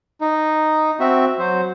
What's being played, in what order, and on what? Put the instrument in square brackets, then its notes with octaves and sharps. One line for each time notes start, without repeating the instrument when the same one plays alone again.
[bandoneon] D#4
C4 F#4 E5
F#3 C5